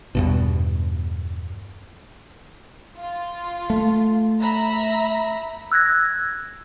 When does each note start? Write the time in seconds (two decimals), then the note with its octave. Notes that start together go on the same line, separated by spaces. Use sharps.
0.15 E2 G2 B2
2.96 F4
3.70 A3
4.42 E5 A#5 B5
5.72 E6 F#6 G#6 A#6